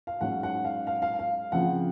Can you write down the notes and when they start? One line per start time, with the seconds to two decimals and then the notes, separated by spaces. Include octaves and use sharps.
0.07 F5
0.21 G#2 F#3 C#4 F#5
0.43 F#5
0.65 F5
0.87 F5
1.02 F5
1.19 F5
1.52 C#3 F3 C4 F#5